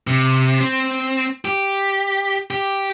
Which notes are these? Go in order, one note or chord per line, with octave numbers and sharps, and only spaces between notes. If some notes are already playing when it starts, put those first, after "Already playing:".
C3
C4
G4
G4